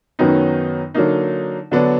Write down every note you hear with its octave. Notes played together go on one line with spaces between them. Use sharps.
F#2 D#3 F#3 B3 D#4
D3 F#3 A#3 D#4
D3 F#3 B3 D4